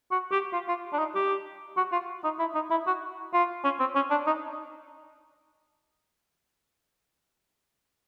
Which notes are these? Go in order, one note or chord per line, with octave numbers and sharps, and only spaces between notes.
F#4
G4
F4
F4
D4
D#4
G4
F#4
F4
D#4
E4
D#4
E4
F#4
F4
C#4
C4
C#4
D4
D#4